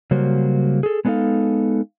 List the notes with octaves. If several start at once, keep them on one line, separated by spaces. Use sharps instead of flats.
C#3 F#3 G3 A#3 F#4 C5
G#4 A4
G#3 B3 D4 D#4 A4 F5